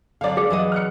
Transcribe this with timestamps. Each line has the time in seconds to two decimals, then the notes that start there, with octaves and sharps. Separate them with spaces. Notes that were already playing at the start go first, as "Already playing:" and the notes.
0.21 D3 F#3 D5 F5
0.37 G#4
0.50 E3 F#3 D#5
0.72 F6 F#6 C#7